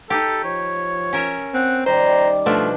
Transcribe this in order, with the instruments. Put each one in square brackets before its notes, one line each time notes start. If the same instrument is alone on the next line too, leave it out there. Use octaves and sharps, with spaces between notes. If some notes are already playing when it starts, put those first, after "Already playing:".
[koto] D#4 G4 [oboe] A4
[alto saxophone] F3 [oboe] C#5
[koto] C#4 A#4 E5
[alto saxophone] C4 [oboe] F#5
[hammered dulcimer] D#3 G3 D5 [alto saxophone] C5 [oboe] A#5
[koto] B2 F3 D4 [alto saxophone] A3 [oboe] F4